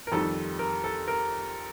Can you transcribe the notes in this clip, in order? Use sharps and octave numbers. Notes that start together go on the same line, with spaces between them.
A#4
F2 D#3 G3 A4
A#4
A4
A#4